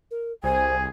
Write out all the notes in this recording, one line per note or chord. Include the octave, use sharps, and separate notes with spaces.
A#4
C2 G#4 C5 G#5